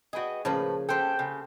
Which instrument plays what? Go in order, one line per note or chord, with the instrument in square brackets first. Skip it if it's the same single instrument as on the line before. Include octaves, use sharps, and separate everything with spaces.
[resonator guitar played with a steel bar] F#4 B4 D#5 [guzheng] G#4 G5
[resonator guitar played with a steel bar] A2 B4 [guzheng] C#3 F3 A#3
[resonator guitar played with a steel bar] C#4 A4 [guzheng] G4 C5 F#5 [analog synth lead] G5
[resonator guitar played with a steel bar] C#3